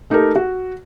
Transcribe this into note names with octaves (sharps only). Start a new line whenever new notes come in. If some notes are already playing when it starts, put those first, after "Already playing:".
A3 D#4 G4 A4 A#4
F#4